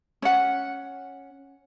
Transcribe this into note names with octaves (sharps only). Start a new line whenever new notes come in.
C#4 F#5